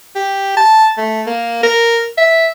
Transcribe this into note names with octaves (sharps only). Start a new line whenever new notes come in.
G4
A5
A3
A#3
A#4
E5